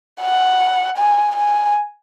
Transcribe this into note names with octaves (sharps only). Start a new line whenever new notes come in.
F#5
G#5
G#5